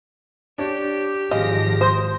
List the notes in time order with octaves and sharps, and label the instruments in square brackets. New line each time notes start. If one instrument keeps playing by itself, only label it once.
[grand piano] D4 C#5 [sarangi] G4
[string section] G#1 F3 A#6 [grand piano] G#4 F5 [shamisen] D#5
[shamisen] C5 [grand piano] D#6 G6